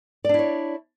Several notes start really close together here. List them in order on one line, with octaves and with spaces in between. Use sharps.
D5 D4 E4 C#5